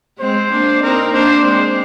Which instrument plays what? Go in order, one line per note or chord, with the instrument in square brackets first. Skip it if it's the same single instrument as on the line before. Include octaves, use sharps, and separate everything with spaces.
[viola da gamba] G#3 C4 [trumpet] C5
[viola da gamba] A#3 D4
[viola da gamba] C4 D#4 [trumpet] A#4
[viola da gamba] A#3 D4 [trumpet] C5
[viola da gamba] G#3 C4